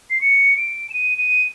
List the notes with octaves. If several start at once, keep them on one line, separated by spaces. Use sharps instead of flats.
C7
C#7
D7
E7
D#7
D#7